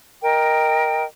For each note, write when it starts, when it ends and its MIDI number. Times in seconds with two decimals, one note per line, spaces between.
0.22 1.04 70
0.22 1.04 75
0.22 1.04 79